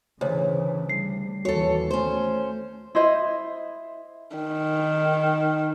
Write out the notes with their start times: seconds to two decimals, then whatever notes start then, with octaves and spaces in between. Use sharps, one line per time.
0.21 D2 C#3 E3 C5 C#5
0.90 G3 C7
1.45 D#2 E3 F#4 A4 C#5
1.91 A3 C#4 C5
2.95 E4 C5 D#5
4.36 D#3